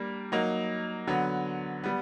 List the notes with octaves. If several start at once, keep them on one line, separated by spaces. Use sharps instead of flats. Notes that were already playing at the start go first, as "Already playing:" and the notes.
Already playing: G3 A#3 D4
F#3 A#3 D#4
D3 F#3 B3
G3 B3